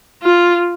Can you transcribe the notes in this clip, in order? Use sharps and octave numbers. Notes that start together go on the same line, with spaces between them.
F4